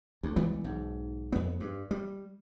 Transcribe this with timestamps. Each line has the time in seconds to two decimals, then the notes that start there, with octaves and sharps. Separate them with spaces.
0.23 D2
0.36 C#2 E3 G3 B3
0.64 B1 G#2
1.32 F2 B3
1.60 G2
1.91 G3